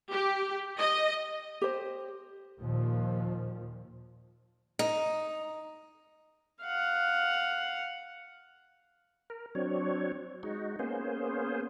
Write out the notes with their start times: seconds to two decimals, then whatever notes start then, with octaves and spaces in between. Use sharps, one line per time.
0.12 G4
0.78 D#5
1.61 G4 C5
2.59 D#2 A#2 F3
4.79 D#4
6.62 F5 F#5
9.30 A#4
9.55 F#3 C4 D4 C#5
10.43 G#3 D#4 F#4
10.79 A#3 B3 C#4 G#4 C5